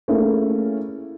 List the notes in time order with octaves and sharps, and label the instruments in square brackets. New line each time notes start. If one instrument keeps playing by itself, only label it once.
[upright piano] A3 A#3 C#4 E4 G#4 A#4